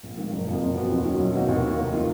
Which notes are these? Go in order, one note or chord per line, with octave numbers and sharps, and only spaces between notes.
A#1
G#2 D#3 A#3
F#1
F2 F3 A#3
F#1
F2 F3 B3 F#4
D#2
D#3 F#3 C#4
B1
B2 A#3 D#4 F#4
D#2
D#3 A#3
F1
D#3 A#3 F4